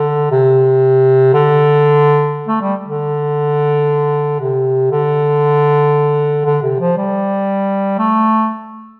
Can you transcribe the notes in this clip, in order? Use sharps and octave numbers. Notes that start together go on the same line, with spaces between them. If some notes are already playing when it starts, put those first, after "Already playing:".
Already playing: D3
C3
D3
A3
G3
D3
C3
D3
D3
C3
F3
G3
A3